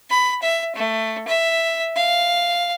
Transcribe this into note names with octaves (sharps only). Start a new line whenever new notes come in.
B5
E5
A3
E5
F5